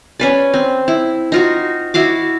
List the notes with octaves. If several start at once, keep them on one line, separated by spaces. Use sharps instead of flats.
C#4 B4 D5
C4
E4
D#4 F4 F#4
E4 F#4 F5 D6